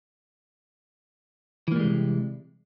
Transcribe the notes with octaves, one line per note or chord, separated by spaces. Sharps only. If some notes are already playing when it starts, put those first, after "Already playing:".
C3 E3 G3 G#3 A#3